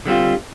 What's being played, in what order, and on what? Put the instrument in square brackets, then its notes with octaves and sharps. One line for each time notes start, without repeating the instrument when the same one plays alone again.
[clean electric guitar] D3 G3 C4 F4